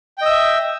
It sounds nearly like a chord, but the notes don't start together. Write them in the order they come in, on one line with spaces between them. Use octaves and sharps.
G5 D#5 E6 E5